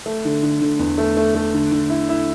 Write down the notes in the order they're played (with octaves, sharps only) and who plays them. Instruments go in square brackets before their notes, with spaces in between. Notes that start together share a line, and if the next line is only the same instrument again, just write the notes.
[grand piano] A3
D3
D3
D3
E2
A3
A3
A3
D3
D3
E4
E4